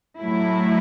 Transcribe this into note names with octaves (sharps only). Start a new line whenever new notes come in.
A2 F#3 A3 E4